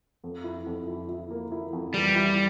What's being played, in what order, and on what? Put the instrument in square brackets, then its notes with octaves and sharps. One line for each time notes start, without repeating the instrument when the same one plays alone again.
[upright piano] F2
E4
F2
E4
E4
A#3
E4
F2
[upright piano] E3 [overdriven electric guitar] G3
[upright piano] E4